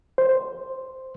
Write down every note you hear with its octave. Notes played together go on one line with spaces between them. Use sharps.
C5